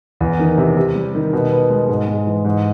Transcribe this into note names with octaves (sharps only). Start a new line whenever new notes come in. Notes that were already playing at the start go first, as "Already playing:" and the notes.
E2
D#3
C3
C3
G3
D#3
B2
B3
G#3
G#2
G#3
E3
G#2